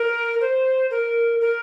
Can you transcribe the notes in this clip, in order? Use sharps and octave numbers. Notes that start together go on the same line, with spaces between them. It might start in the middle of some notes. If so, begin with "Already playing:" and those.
Already playing: A#4
C5
A#4
A#4